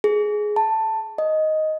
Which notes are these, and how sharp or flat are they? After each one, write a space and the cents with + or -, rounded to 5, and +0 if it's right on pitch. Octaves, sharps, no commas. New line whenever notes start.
G#4 +10
A5 +10
D#5 +5